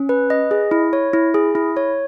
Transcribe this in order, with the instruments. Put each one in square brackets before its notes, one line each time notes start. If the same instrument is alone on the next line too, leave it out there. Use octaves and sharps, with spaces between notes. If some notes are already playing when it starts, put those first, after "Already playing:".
Already playing: [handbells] C#4
B4
D#5
G#4
E4
C#5
E4
G#4
E4
C#5